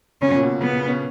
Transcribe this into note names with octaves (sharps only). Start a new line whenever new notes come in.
C#3 C#4
B2
A#2
B2
C#3 B3
C#4